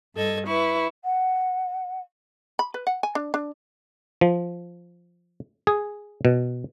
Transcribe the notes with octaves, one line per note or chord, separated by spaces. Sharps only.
G2 A4 D#5 G#6
E4 B4 C#6
F#5
B5
B4
F#5
G#5
D4
D4
F3
G#4
B2